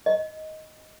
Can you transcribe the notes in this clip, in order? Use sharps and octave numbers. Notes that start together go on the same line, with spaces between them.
D#5